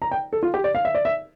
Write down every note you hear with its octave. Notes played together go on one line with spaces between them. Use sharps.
A#5
G5
A4
F4
G4
D5
F5
E5
D5
E5